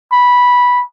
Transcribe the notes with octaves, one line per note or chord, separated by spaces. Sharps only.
B5